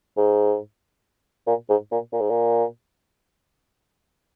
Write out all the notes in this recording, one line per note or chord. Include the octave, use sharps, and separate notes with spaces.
G#2
A#2
G#2
A#2
A#2
G#2
A#2